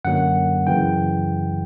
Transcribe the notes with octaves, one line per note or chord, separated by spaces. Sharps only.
F#2 D3 F#3 A#3 F#5
F#2 C#3 E3 G5